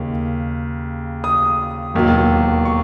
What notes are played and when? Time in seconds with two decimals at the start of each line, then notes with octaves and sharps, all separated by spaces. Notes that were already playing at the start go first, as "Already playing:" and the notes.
Already playing: D#2 C#3
1.24 D#6
1.94 E1 D#2 D#3 F#3
2.65 C#6